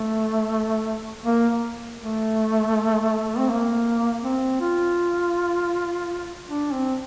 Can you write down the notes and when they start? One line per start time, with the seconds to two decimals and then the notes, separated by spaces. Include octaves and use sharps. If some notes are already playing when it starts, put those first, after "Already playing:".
Already playing: A3
1.26 A#3
2.01 A3
3.38 C4
3.50 A#3
4.24 C4
4.61 F4
6.47 D4
6.72 C4